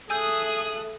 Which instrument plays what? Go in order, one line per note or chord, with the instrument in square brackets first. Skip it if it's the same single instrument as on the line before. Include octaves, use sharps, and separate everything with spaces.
[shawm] G#4 [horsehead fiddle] A4 E5 [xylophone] G#5 E6 G6 [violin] D#6 F#6